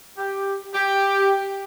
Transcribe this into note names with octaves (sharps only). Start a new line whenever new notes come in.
G4
G4